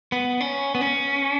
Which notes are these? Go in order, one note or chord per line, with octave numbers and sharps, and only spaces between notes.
B3
C#4
B3
C#4